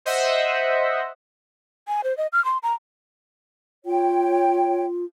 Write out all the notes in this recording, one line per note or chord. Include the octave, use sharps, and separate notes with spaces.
C5 D#5 E5 F#5
G#5
C5
D#5
F6
C6
A#5
F4 C#5 G5